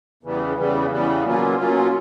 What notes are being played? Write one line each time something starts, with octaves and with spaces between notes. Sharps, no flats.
E2 C#3 E3 G3
E2 C#3 E3 G3
E2 C#3 E3 G3
B2 F#3 A#3 C#4 F4
B2 F#3 A#3 C#4 F4